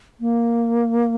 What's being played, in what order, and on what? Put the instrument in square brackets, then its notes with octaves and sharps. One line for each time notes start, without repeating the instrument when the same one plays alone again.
[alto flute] A#3